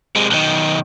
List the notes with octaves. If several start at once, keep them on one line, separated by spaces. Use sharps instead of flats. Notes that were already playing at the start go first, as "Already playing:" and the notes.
C3 G#3
B1 D#3